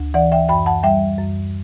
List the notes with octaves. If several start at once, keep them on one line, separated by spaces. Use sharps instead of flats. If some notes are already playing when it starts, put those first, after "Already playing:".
Already playing: D2
E3 D5 F#5
E5 G5
F#2 G5 B5
F#5 A5
G3 E5 G5
F#2